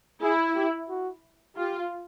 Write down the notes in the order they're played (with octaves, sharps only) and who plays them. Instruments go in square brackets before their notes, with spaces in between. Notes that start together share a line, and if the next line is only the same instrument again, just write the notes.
[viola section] E4 [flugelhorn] G#4
[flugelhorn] G4
F#4
[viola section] F4 [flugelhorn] G4